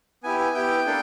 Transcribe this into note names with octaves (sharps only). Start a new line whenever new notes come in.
B3 E4 G4 G#5
G#5
B3 E4 G4 G5
A#3 D4 A4